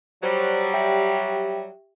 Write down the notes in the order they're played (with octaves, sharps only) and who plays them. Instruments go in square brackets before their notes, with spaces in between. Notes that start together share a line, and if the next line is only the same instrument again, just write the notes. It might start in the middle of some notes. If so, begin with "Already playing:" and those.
[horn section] F#3 G3 [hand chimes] C5
[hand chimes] G4 E5 G5